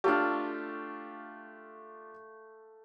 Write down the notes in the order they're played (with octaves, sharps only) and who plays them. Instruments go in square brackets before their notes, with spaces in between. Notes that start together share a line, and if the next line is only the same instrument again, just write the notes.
[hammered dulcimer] A3 F5 [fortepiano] D4 F4 G4